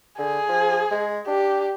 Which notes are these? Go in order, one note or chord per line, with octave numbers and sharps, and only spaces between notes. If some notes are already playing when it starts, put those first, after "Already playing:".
D3 G#4
F3
G#3
D4 G4